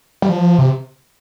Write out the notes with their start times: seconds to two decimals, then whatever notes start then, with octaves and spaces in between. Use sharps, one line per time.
0.22 G3
0.29 F3
0.58 C3